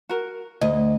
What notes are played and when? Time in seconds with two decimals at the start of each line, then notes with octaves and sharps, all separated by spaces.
0.09 F#4 A#4
0.61 D2 D#5